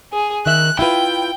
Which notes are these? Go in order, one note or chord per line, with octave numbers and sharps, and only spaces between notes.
G#4
D#3 A#4 E5 F#6
E4 F4 B4 G5